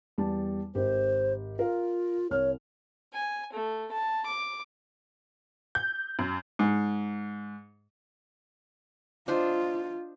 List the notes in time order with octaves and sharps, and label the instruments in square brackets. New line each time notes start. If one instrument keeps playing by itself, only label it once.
[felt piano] E2 G3 A5
[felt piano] G#1 G4 [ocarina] C5
[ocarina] F4 [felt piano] A#4 F5
[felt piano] C2 F6 [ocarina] C#5
[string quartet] G#5
A3
A5
D6
[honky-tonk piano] G6
F#2
[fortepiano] G#2
[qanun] D4 C5 D#5 [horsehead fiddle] F4